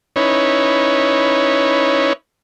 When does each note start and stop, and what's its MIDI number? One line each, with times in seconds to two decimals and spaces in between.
0.16 2.13 61
0.16 2.13 63
0.16 2.13 64
0.16 2.13 71
0.16 2.13 73